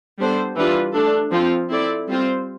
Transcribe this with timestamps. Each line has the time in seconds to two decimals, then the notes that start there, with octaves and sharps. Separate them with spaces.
0.18 G3 B3 D4 A4 C5
0.56 E3 G3 D4 F4 B4
0.94 A3 D4 A4
1.31 F3 C4 F4
1.69 C4 E4 A4 D5
2.07 G3 C4 F4 C5